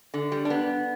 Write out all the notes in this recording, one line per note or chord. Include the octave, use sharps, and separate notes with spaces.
D3
G3
D4
B3